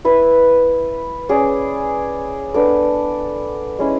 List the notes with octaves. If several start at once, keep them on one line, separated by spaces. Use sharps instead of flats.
E4 B4 E5
C#4 G#4 D5
B3 D4 A4 D5
G#3 C#4 E4